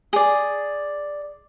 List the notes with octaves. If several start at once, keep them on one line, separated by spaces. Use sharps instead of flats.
G#4 D5